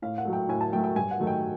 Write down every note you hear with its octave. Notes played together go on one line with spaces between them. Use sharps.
A2 F5
F#5
F#3 A3
G5
A2 G#5
A5
F#3 A3 G5
G5
G2 G#5
F#5
D#3 F#3 A3
G5